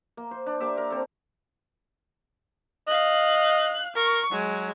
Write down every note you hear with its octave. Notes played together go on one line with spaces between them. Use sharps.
A#3
C5
D4
A#3 G4 D5 E5
A#4
C4 A4
D#5 F5 F#6
A#4 C#6
F#3 G#3